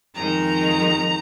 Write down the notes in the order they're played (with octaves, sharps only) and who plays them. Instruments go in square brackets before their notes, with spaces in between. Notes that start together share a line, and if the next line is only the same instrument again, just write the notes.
[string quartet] F2 D#3 G#3 A#5